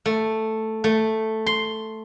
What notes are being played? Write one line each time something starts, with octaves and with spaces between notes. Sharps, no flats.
A3
A3
C6